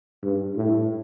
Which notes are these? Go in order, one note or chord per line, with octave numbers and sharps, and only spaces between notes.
G2
A2